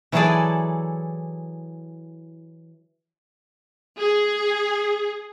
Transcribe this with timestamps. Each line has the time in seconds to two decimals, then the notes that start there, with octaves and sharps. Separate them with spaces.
0.12 E3 F#3 E4 G#4 A4 D5
4.00 G#4